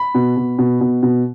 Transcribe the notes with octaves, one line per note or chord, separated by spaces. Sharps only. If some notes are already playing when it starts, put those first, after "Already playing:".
Already playing: B5
B2
B2
B2
B2
B2